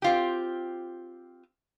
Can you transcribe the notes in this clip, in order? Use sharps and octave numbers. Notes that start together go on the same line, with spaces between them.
C4 F4 G4